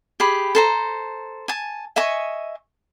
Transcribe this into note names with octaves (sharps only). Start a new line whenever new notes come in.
G4 G#4 B5
A4 C5 A#5
G#5 A5
D#5 E5 G#5 C#6